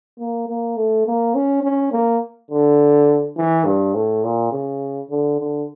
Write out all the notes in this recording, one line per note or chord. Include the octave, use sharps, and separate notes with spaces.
A#3
A#3
A3
A#3
C#4
C#4
A#3
D3
E3
G2
A2
A#2
C#3
D3
D3